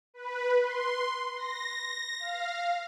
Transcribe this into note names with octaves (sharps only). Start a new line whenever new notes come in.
B4
C6
A#6
F5